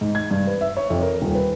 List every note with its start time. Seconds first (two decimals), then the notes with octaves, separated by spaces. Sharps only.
0.01 G#2
0.15 G#6
0.31 G2
0.47 B4
0.61 E5
0.77 C#5
0.90 F2
1.02 A#4
1.22 D#1
1.35 B4